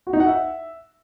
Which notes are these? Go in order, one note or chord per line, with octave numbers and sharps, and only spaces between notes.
F#4
D#4
F#5
E5